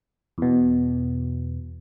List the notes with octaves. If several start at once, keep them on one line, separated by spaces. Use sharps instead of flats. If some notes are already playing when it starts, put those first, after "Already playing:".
E2 B2